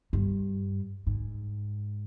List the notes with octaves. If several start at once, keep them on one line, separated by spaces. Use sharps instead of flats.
G2
G#2